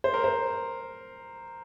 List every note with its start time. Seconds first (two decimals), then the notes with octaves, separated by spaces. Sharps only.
0.04 C5
0.14 A#4
0.24 C5